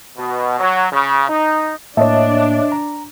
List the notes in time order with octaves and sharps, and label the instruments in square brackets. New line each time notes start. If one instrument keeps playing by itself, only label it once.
[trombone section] B2
F#3
C#3
D#4
[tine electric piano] A2 A#3 A5 [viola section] D4 [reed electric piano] C#5 D#5 E5
[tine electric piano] A#5